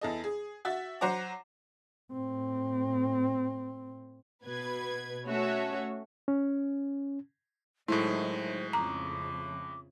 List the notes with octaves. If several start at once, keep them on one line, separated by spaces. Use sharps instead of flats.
E2 A4 D#5
G#4
F#4 E5 A6
F#3 C5 F#5 A#5 D6
A2 C4
B2 B4 G#6
A3 C#4 F#4 A4 C#5 E5
C#4
A2 D#3 F#3 G#3 A3 D#4 E4 C5
F2 C#3 A#5 D6